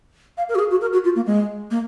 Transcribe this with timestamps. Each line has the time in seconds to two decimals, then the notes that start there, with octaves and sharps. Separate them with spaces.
0.37 F5
0.49 A#4
0.55 F#4
0.59 G#4
0.71 F#4
0.81 A#4
0.93 F#4
1.04 F4
1.16 A#3
1.26 G#3
1.71 A#3